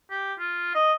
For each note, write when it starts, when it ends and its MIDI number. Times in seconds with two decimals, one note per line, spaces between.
0.10 0.33 67
0.39 0.70 65
0.75 0.92 75